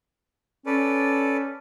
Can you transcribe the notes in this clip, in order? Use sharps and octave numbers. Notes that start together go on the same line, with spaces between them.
C#4 A4 B4 D5